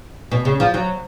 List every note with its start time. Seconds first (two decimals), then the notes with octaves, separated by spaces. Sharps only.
0.31 B2
0.45 C#3
0.60 F3
0.74 F#3